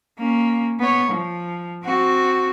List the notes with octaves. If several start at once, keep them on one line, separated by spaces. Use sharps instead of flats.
A#3 C#4
B3 C#5
F3
C4 F#4